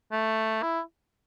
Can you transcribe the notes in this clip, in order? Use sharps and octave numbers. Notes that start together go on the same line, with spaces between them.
A3
E4